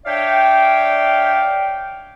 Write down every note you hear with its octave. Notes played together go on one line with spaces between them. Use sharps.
D4 C#5 D5 E5 F5 G5